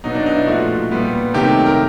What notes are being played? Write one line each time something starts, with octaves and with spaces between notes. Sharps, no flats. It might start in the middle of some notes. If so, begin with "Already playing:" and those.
B2 F#3 B3 D#4
D4
D#4
E4
A#2 F3 A3 F#4
A#2 G3 B3
C3 D#3 F#3 A3 G4
A#4